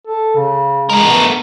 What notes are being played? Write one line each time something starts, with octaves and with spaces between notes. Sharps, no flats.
A4
C#3
G#3 A3 A#4
B3